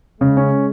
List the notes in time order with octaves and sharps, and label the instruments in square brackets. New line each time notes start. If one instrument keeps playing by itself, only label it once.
[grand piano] C#3 [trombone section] G#3
[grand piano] C#4